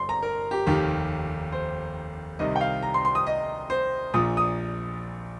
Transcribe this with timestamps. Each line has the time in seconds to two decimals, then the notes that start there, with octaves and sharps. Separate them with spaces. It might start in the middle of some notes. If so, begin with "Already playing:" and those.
Already playing: G1 C6
0.09 A#5
0.23 A#4
0.51 G4
0.66 F1 D#2 D#3 G4
1.52 C5
2.39 C2 C3 D#3 D#5
2.56 G5
2.61 F5
2.82 A#5
2.94 C6
3.05 C6
3.15 D#6
3.27 D#5
3.70 C5
4.14 A#1 A#2 D#6
4.37 D#6